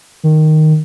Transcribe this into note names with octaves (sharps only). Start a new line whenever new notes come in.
D#3